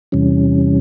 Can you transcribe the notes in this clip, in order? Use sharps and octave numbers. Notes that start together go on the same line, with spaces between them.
E2 C3 E3 G3 C#4